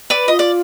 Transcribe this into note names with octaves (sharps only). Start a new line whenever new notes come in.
B4 D5
F4 D#5
D5